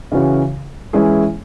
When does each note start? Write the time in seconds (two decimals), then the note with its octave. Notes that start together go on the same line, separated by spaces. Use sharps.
0.12 C#3 E3 C#4 F#4 C#5
0.93 E3 G#3 C#4 E4 G#4